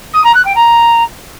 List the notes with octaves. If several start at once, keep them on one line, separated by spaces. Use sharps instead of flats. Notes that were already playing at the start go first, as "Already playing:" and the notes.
D#6
A#5
F#6
G5
A#5